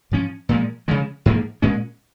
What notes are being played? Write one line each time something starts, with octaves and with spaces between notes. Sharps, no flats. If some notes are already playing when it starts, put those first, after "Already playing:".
G#2 F3 C#4
A#2 F3 G#3
C#3 F3 G#3
G#2 F3 A#3
A#2 G#3 C#4